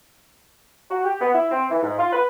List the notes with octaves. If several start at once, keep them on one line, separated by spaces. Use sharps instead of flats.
F#4
G4
B3
E4
C4
E3
G#2
F4
B4